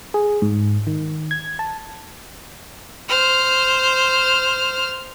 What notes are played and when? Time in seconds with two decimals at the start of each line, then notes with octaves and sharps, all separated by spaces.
0.14 G#4
0.42 G#2
0.87 D#3
1.31 G#6
1.59 A5
3.08 C5 F6